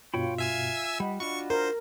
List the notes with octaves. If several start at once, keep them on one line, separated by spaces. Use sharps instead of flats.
G2 B2 F4 C#5 G5 B5
E5 F5 G#5 E6
G3 D#5 F#5 B5
D4 F4 F#4 C#6 C#7
A#4 C5